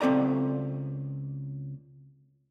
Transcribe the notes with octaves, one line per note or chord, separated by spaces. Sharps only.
C#2 C4 A4 D5 A#5